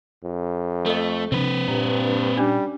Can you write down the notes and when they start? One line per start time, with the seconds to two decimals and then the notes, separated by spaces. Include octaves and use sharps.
0.24 F2
0.86 A3 A4 D#5
1.32 C3 F3 C4 D4 B4
1.68 G2 A#2 A#5
2.37 G3 C#4 D4